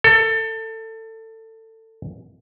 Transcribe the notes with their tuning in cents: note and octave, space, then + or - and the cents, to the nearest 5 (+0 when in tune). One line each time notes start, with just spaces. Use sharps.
A4 +25